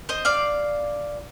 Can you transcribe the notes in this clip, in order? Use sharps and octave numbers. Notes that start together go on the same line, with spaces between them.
C5 D#5
D5 F5